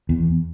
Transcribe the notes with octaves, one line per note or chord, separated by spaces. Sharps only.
E2